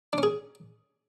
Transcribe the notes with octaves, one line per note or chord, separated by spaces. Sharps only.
D4
C#4
G#4